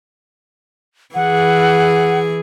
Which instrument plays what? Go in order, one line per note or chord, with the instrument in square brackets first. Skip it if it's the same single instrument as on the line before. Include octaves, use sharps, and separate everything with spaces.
[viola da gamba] E3 G#4 [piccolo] F#5